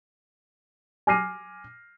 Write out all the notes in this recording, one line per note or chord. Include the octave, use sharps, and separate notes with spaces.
G#5 D6 F6 A#6 C7 D#7